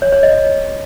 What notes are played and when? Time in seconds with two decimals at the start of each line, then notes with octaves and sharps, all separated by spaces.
0.02 C#5
0.12 C#5
0.23 D#5